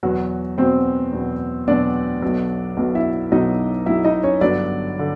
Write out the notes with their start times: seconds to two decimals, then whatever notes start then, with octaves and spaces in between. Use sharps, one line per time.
0.03 E2 B2 F#3 F#4
0.58 E2 B2 F#3 C4 C5
1.13 E2 B2 F#3
1.68 E2 B2 F#3 D4 D5
2.22 B1 B2 F#3
2.77 B1 B2 F#3
2.95 E4 E5
3.32 B1 B2 F#3 D#4 D#5
3.86 B1 B2 F#3 E4 E5
4.05 D#4 D#5
4.23 C#4 C#5
4.41 G1 G2 D3 F#3 D4 D5
4.99 D3